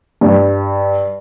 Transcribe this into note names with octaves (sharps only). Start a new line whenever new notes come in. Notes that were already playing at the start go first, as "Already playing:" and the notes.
G2